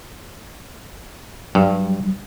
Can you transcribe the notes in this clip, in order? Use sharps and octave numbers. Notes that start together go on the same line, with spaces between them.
G2 F#3 G3